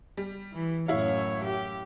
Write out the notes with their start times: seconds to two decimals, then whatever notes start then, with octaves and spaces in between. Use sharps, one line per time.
0.17 G3
0.53 E3
0.88 F#2 A2 E4 C#5 F5
1.44 G4